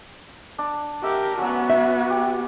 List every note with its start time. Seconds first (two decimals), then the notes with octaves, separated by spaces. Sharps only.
0.59 D4
1.03 G4 A#4 E5 F#5
1.38 F#3 B3 C#4 F#4
1.70 E5
2.10 G4